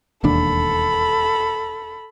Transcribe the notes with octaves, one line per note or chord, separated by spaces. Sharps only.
E1 D#2 D4 A4 B5